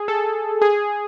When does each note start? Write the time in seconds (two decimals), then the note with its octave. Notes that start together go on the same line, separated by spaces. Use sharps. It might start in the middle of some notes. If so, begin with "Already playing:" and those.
Already playing: G#4
0.08 A4
0.62 G#4